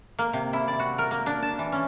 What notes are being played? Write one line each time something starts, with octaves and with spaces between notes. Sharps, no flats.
A#3
C3
E4
D5
F#4
A#4
A#3
D4
A5
E3
C#4